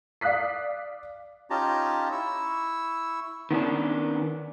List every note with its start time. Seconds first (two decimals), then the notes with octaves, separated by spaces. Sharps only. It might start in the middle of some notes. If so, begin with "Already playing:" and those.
0.21 D5 F5 D#6 F#6 B6 C7
1.50 C#4 D#4 F4 G4 A5 A#5
2.12 E4 C#6 E6
3.51 D#3 B3 C#4 D4